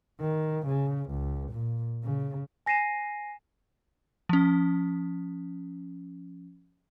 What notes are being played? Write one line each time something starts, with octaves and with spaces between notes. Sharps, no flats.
D#3
C#3
C#2
A#2
C#3
G#5 A#6 C7 D#7 E7
F3 C#4